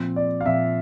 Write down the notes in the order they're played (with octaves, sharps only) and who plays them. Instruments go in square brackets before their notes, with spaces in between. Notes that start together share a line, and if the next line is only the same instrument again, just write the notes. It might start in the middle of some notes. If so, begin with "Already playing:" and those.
Already playing: [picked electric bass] A#2 F3 C4
[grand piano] D5
F5
[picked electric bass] A#2 F3 C4 [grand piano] E5